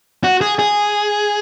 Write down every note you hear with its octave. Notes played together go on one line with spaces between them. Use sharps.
F#4
G#4
G#4